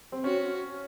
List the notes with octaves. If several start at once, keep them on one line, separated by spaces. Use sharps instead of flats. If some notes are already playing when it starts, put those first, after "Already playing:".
C4
C#4 F#4